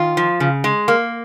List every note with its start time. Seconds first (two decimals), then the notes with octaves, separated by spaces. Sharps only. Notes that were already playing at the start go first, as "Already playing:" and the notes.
Already playing: D#3 F4
0.17 F3
0.40 C#3
0.64 G#3
0.88 A#3